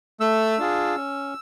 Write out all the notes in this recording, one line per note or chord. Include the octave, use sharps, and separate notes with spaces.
A3 E6
D4 F4 G#4
C#4